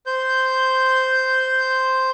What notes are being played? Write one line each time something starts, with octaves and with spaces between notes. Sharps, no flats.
C5 G6